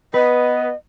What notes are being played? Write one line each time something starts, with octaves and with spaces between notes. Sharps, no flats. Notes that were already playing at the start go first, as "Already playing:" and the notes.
B3 B4 D#5